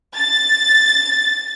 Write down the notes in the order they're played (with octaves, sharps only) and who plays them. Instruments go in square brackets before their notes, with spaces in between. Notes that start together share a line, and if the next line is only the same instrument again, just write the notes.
[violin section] A6